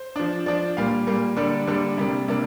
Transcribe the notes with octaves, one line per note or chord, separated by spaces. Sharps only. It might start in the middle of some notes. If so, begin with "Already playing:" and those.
Already playing: C5
F3 D4
F3 D4 D5
A#2 G3 A#3 F5
A#2 G3 A#3
D3 G3 A#3 D4 D5
D3 G3 A#3 D4
C3 G3 A#3 D4
C3 G3 A#3 D4